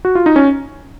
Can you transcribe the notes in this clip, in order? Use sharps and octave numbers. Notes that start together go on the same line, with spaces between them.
F#4
F4
D#4
C#4